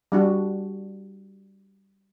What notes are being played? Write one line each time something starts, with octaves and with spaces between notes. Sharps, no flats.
G3 D4 F#4